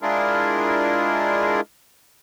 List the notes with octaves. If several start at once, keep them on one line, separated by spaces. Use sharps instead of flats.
G#3 D4 E4 F4 G#4 A#4